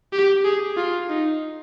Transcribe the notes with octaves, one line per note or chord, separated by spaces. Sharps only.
G4
G#4
F4
D#4